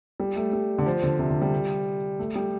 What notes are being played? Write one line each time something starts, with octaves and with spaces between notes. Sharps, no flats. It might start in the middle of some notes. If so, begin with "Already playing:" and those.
G3
A3
G3
D3
F3
D3
C3
D3
G3
A3
G3